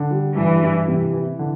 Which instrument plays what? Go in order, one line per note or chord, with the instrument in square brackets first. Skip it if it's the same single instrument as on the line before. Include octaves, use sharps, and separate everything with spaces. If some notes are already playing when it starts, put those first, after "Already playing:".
Already playing: [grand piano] D3
G3
[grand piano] G2 [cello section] E3
[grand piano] G2
C3
E3
D3